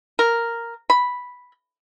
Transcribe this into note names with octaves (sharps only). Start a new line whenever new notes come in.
A#4
B5